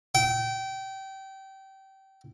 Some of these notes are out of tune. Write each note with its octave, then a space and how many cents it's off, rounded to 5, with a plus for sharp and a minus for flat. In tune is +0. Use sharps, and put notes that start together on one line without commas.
G5 -25